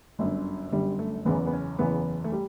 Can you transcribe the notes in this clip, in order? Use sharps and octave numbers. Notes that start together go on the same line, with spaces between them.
G1 F#2 D3
G1 F#2 D3 G3
A3
F#1 E2 C#3 E3 B3
B3
C#4
F#1 E2 C#3 E3 B3
A3
G3